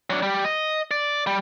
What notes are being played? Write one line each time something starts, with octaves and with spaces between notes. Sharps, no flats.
F#3 D4
G3
D#5
D5
G3